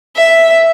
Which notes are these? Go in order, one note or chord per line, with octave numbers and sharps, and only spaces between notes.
E5